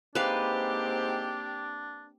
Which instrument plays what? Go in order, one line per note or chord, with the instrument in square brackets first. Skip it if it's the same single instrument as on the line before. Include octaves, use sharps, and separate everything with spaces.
[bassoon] G#2 [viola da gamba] A#3 C4 G4 [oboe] D4 [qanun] B4 F5